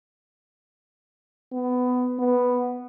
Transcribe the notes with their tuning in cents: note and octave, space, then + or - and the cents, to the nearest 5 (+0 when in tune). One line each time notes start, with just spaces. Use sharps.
B3 +20
B3 +0